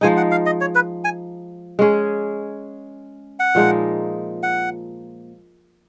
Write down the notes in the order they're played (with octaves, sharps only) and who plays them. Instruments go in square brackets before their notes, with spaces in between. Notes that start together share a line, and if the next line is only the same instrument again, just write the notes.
[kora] F3 G#3 D#4 [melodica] G#5
[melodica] F#5
F5
D#5
C#5
B4
G#5
[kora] G#3 C#4 G#4
[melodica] F#5
[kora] A#2 F3 G#3 D#4
[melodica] F#5